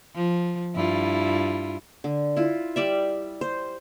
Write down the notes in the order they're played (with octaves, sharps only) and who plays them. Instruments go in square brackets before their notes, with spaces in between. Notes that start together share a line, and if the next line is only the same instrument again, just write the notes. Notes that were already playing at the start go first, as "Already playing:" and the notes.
[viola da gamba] F3
G2 E4 F4
[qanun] D3
E4 F4
G3 D5 E5
C5